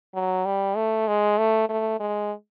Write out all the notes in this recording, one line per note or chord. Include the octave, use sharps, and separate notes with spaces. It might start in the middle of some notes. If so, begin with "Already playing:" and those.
F#3
G3
A3
G#3
A3
A3
G#3